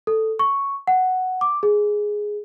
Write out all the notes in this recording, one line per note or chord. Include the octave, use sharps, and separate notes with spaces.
A4
C#6
F#5
D6
G#4